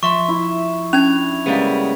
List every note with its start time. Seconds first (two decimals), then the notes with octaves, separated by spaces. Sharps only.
0.03 F3 E5 C6 C#6
0.29 E4
0.93 C#4 D4 G#6 F7
1.46 C#3 G3 G#3 A#3 B3